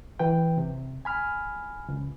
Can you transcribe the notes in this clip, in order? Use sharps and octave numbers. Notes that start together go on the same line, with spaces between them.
E3 B4 G5
C3
G#5 B5 F6
C#2